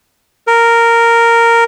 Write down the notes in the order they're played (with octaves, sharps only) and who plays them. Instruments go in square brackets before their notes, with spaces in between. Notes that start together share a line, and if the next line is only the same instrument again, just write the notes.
[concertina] A#4